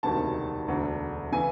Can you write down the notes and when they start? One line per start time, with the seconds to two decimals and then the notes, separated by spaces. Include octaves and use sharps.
0.03 E1 D2 C3 D#3 A5
0.68 E1 D2 D3
1.32 C#3 E3 G#5